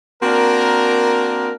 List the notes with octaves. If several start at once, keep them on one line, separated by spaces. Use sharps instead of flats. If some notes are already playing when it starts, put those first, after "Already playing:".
A#3 C4 D4 F#4 A#4